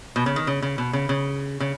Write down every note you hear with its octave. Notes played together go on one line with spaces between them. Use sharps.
B2
C#3
D#3
C#3
C#3
B2
C#3
C#3
C#3